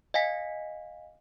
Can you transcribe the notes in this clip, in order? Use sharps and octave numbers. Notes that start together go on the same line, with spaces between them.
D#5 F5 G#5 B6